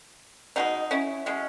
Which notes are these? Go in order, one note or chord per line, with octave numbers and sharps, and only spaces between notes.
B2 G#3 B3 D#4
C#4 E4
B2 G#3 C#4